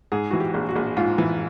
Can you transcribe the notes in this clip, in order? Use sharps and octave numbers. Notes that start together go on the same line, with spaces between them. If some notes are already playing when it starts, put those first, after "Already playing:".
G#2 G#4
E3 F#4
G4
A#1
F#4
A#1
G#2 F4
E3